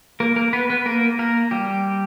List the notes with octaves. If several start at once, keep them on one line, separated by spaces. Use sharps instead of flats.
A#3 A#4
A#3 A#4
B3 B4
B3 B4
A#3 A#4
A#3 A#4
G3 G4